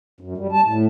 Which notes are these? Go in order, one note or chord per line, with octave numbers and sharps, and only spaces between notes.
F#2
G3
A5
A2